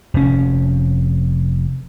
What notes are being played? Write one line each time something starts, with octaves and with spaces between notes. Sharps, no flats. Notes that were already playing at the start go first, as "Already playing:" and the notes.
F1 C#4